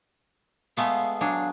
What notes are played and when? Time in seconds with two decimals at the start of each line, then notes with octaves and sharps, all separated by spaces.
0.77 G#3 A3 B3 F5
1.21 F#3 D4 G#4